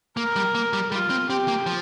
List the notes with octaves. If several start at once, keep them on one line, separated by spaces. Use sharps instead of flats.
A#3 A#4
G3
A#3
G3
G3 F4
C4
C4 G4
A#3
F3